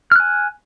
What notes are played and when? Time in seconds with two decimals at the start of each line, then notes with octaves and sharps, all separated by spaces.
0.12 F6
0.16 F#6
0.20 G#5